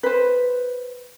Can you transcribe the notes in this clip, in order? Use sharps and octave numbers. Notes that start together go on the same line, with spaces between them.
B4 C5